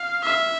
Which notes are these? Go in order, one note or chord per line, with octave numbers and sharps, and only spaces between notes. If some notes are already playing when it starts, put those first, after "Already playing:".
Already playing: F5
E5